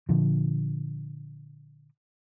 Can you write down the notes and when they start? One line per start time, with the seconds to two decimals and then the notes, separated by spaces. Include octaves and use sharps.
0.09 A#2 D3 F3